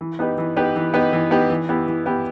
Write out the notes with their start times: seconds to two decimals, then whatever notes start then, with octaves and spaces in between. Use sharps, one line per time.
0.01 E3
0.19 B3 D#4 G4 B4
0.38 E3
0.56 B3 D#4 G4 B4
0.76 E3
0.94 B3 D#4 G4 B4
1.13 E3
1.31 B3 D#4 G4 B4
1.50 E3
1.69 B3 E4 G4
1.87 E3
2.06 B3 E4 G4